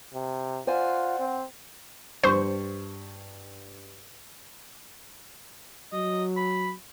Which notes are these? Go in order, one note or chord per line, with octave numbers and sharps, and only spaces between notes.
C3
F4 C5 D5 F#5 G#5
C4
G2 C5 C#6
F#3 D#5
B5